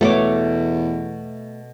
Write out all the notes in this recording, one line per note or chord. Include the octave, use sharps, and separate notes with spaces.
E2 B2 A3 C#5 D6